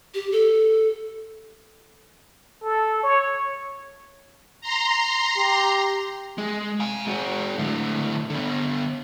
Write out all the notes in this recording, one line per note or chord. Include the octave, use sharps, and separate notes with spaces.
G4
A4
A4
C#5
A#5 C6
G4
G#3
F5 G#5
G#3 F#4
A2 D3
D3 B3